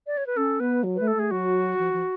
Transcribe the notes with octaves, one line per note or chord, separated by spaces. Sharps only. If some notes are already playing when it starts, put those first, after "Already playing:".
D5
C#5
B4
C#4 A4
B3 B4
F#3
A3 B4
A4
A3 G#4
F#3 F#4
F3
F3